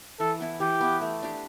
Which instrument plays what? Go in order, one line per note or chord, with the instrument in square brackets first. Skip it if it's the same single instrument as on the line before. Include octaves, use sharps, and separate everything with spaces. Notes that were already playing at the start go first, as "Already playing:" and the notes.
[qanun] E3 [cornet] A4
[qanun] B3 E4
[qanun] E3 [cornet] G4
[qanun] B3 E4
A3
D4 G4